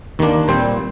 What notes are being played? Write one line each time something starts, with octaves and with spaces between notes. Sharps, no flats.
D#2 D#3 A#3 D4
A#2 G3 C4 C5